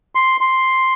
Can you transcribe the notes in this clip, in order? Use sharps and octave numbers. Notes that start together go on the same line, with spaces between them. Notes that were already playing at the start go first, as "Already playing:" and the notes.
C6
C6